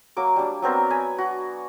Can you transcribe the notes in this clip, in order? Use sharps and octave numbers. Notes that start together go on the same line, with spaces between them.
F#3 A#3 D6
G3 D4
F#3 B3 C4 A#4
G#5 B5
F#4